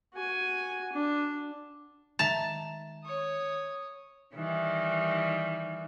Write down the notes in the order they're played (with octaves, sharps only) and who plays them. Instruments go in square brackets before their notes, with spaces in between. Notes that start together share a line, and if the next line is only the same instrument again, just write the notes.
[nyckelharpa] F#4 G#5
D4
[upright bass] D#3 G#3 [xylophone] E5 A#5 [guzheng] A5
[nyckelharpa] C#5 D#6
[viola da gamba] D#3 E3 G3